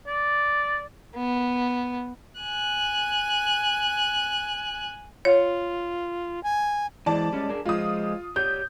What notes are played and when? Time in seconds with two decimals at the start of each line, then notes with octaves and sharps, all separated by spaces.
0.07 D5
1.15 B3
2.41 G#5 F#6
5.25 F4 C#5
6.43 G#5
7.06 E3 G#3 C4 D5 A5
7.33 G3 G#3 C#4
7.49 D4 G#4 A#4
7.66 F3 G#3 F4 D#6
8.36 G4 C#5 D5 G6